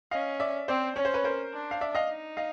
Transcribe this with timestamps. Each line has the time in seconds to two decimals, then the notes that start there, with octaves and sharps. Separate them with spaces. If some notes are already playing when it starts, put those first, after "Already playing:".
0.11 C#4 D#5 F5
0.40 D5 E5
0.68 C4 C5 D5
0.96 C#4 C#5
1.05 C5
1.14 B4 C#5
1.24 A#4 C5
1.53 D4
1.71 F5
1.81 D5 E5
1.95 D#5 F5
2.10 D#4
2.37 D#5 F5